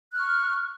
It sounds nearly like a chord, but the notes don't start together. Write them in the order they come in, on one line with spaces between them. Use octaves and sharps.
F#6 F6 C#6